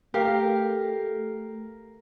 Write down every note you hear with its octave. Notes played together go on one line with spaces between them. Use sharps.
A3 G4 A#4 F5